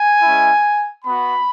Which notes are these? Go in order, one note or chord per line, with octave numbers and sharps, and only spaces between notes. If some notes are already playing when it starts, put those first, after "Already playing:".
Already playing: G#5
G#3 C#4 E4
B3 F#4 B5